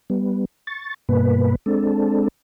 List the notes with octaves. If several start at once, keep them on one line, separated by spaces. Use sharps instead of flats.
G3 B3
C#6 A6
G2 B2 A#3 B4
G#3 C4 D4 A4